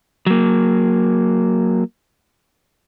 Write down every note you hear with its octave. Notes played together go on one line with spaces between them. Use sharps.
F#3 A#3